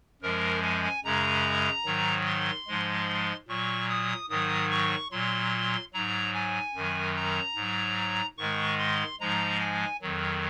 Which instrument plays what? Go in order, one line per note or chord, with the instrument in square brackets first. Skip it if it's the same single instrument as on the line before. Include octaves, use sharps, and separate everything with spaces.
[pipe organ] F#2 F3 G#3 A#4
G#5
F#2 C#3 G#3 A#5
G#2 D#3 F#3
C6
G#2 F3 G#3
A#2 F#3 C#6
D#6
G#2 D#3 F#3 D#6
C#6
A#2 F#3 C6
G#2 F#3 A#5
G#5
F#2 D#3 F#3
A#5
G#2 F#3
G#2 D#3 G#3 C#6
C6
G#2 F3 G#3 A#5
G#5
F2 D#3 F#3